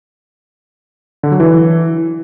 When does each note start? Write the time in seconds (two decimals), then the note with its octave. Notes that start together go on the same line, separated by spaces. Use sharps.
1.23 D3
1.32 F#3
1.40 E3